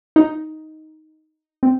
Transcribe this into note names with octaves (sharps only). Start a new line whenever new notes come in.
D#4
C4